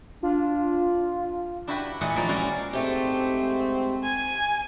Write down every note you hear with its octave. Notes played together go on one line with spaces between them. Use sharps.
D4 F4
D4 E4 F#4 G4 B4
A#2 E3 A3 D#5 F#5
F3 A#3 F4 D5
G#3 C#4 E4 F#4 C#5 D5
G#2 A3 C4 G4
G#5